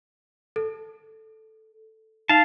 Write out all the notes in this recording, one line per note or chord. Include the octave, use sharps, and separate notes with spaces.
A4
D#4 F5 A5